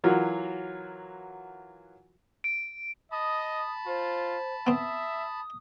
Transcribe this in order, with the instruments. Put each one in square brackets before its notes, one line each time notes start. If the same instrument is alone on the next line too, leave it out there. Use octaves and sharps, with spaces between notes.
[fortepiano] E3 F#3 F4 F#4 A#4
[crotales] D7
[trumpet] D#5 [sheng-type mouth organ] A5 B5 [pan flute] D#6
[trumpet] F4 [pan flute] C5
[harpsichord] B3 C4 [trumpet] E5 [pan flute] D#6